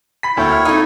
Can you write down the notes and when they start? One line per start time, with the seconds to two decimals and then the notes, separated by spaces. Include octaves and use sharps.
0.23 B5 B6
0.37 D2 A#3 E4 C5 C#5 G5
0.51 F6
0.65 A3 C4 D#4 F4